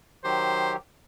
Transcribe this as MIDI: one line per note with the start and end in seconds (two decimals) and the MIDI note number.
0.24 0.76 51
0.24 0.76 54
0.24 0.76 67
0.24 0.73 72